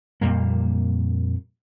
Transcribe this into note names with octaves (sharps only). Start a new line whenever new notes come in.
F2 A#2 G3 A#3